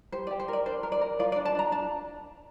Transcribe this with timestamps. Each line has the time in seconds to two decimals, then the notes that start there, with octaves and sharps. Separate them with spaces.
0.12 G4 C5
0.27 D5
0.31 G4
0.40 C5
0.48 A#4 D5
0.66 D4 C5
0.83 A#4
0.92 D5
1.01 A#4
1.19 F4 D5
1.32 D5
1.36 D4
1.45 A5
1.55 D4 A#5
1.72 D4 A5